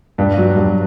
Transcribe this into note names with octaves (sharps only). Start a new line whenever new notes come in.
G2
F#3
G2